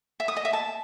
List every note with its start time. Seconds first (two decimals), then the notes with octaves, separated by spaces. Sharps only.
0.20 E5
0.28 D#6
0.37 D#5
0.45 E5
0.53 A5